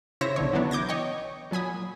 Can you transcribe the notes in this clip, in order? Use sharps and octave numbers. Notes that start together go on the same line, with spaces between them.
C#3 E4 C5 C#5 E5 A#6
B1 D3 C#5
D3 E3 F#3 B3 D4
D6 G6 G#6 A#6
C#5 D#5 G5 C#6
A#2 F#3 G#5 B5 D#6